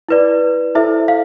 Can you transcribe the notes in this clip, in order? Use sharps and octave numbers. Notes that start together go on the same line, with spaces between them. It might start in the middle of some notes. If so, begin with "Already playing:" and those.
E4 B4 D5
E4 A4 C5 E5
F5